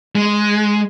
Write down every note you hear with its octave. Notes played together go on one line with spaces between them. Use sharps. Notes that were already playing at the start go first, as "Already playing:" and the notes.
G#3